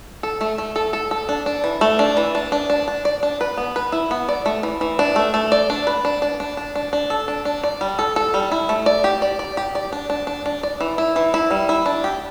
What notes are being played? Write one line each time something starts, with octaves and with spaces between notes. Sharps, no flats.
A4
A3
A3
A4
A4
A4
D4
D4
E3
A3
D4
E3
D4
D4
D4
D4
D5
D4
B4
B3
B4
E4
B3
D5
A3
E3
E3
D4
A3
A3
D5
D4
B4
D4
D4
D4
D4
D4
D4
A4
D4
D4
D5
G3
A4
A4
G3
E4
A3
D5
G4
D5
D5
G4
D5
D4
D4
D4
D4
D5
E3
E4
E3
E4
G3
E4
D4
G4